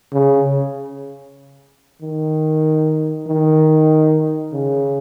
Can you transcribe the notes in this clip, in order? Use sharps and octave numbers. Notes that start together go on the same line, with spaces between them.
C#3
D#3
D#3
C#3